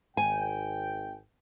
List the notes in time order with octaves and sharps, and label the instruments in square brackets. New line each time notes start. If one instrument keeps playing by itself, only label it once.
[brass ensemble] G#1 G5 [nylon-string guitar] G#5